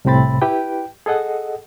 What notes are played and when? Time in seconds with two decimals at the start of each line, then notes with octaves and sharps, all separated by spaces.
0.05 C2 A2 C3 C4 B5 A6
0.42 E4 G4 B4 G5
1.06 G#4 A4 D#5 F#5